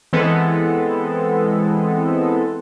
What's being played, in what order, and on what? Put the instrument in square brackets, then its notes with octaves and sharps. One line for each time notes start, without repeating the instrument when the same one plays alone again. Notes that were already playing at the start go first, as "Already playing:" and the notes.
[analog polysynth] E3 G#3 B3 C4 A4